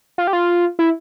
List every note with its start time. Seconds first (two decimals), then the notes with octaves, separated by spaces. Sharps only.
0.18 F4
0.27 G4
0.33 F4
0.79 E4